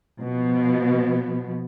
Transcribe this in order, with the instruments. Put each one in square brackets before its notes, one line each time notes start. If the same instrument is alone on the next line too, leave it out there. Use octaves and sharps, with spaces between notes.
[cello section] B2 F3 B3